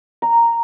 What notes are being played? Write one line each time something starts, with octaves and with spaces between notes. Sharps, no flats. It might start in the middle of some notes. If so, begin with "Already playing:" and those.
A#5